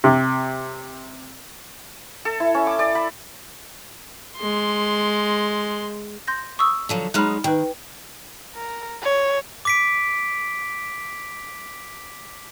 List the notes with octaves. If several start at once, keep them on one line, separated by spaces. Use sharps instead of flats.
C3
A4
E4
C#4
D6
D5
B5
G#3 C6
C6 G6 A#6
C#6 D#6 E6
D3 F3 F#3
F#3 G#3 D#4 B5 F6 F#6
D#3 B4 G5
A#4
C#5
D6 B6 D7